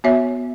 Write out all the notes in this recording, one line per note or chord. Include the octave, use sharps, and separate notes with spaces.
B3 F#4 C#5 E5